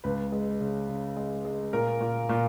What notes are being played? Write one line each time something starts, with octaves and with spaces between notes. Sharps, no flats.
C#2 B4
G#3
C#3
C#3
G#3
G#3
A#2 A#4
A#2
A#2